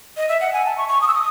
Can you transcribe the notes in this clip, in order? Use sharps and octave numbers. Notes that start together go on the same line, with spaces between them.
D#5
E5
F#5
G#5
A5
C#6
C#6
D#6
E6
D#6